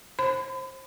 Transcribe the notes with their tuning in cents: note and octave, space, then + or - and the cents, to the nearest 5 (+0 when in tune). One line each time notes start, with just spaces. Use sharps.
C5 +25 B5 +40